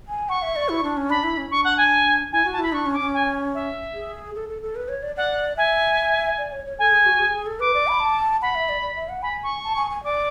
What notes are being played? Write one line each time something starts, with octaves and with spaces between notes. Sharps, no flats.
G#5
F#5 C#6
E5
D5
E4
D4
C#4
D4 B5
E4
C#4
D4 C#6
F#5
G#5
E4 G#5
F#4
A5
E4 B5
D4 C#6
C#4
D6
C#4
G#5
E5
G#4
A4
A4
A4
B4
C#5
D5
D5 F#5
E5 G#5
D5
C#5
C#5
A4 G#5
G#4
F#4
G#4
G#4
A4
B4 D6
D5
B5
A5
F#5 B5
E5
D5
D5
E5
F#5
G#5 B5
C#6
A5
G#5
G#5
D5 D6